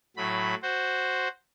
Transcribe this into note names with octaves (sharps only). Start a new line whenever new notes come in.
A2 F#3 B5
F#4 C5